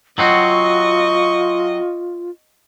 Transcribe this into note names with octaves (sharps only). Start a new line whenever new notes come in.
F#3 C4 F4 F#4 D#5 C#6